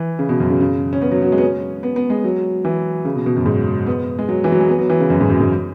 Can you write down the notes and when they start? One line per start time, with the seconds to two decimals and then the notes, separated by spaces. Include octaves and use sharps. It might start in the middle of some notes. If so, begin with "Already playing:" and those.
Already playing: E3
0.19 C#3
0.29 B2
0.40 F#2
0.50 C#3
0.61 C#3
0.93 C#4
1.02 B3
1.12 F#3
1.22 F#3
1.32 G#3
1.38 B3
1.42 C#4
1.83 B3
1.96 B3
2.10 G#3
2.24 F#3
2.65 E3
3.05 C#3
3.16 B2
3.26 B2
3.37 F#2
3.46 G#2
3.87 B3
4.19 G#3
4.29 F#3
4.44 E3
4.52 F#3
4.60 G#3
4.69 B3
4.79 F#3
4.90 E3
5.00 C#3
5.10 F#2
5.21 G#2
5.30 F#2
5.41 G#2